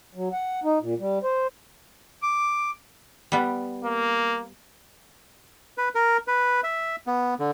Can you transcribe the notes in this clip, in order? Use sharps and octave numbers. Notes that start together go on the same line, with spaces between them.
F#3
F#5
D#4
A#2
G3
C5
D6
G3 B3
A#3
B4
A#4
B4
E5
B3
D3